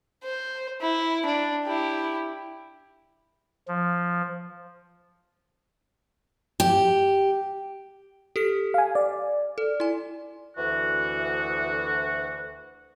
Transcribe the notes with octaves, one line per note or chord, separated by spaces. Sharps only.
C5
E4
D4
E4 G4
F3
G4
G4 A4 B6
F5 G#5
D5
A4
E4 G#5
D2 E3 F#4